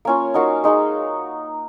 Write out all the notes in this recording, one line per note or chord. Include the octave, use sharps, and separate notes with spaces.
A#3 C#4 F4
D#4 F#4 A#4 F5
G#3 D#4 G#4